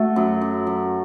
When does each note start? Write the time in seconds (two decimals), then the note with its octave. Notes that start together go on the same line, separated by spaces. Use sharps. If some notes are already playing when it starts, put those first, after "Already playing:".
Already playing: A3 F#4 A4
0.16 F#2
0.41 F#2
0.67 F#2